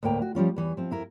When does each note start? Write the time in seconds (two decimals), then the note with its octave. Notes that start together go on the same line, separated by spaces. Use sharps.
0.03 D2 A2 A#3 G5 A#5
0.22 F#4
0.35 F3 G3 C#4 F4
0.56 E2 E3 C#5
0.77 F3 C4
0.91 F2 E4 A#4